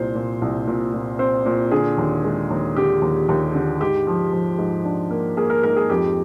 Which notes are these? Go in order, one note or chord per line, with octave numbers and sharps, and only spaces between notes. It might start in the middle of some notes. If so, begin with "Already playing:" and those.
Already playing: C2 A#2 C5
A#2
C2
A#2
A#2
C4 C5
A#2
D3 G#4
D#2
G#3
D#2
D3 G4
D#2
D#2
D3
G#2 G4
F3
F3
G#2
D4
A#3
A#3 G#4
A#4
G#2 A#4
G#4
F2 G4